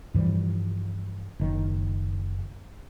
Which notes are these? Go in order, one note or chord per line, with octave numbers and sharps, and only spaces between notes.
G2 E3 F3 G3
F#1 D#3 F#3